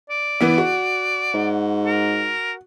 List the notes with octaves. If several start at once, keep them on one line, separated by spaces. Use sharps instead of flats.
D5
E3 B3
F#4
G#2
A#4